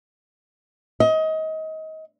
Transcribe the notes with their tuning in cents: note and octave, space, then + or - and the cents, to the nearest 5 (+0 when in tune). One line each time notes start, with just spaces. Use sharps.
D#5 +25